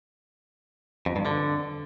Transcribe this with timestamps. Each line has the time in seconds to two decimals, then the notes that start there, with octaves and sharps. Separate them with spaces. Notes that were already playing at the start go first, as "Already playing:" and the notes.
1.06 F2
1.16 G2
1.25 D3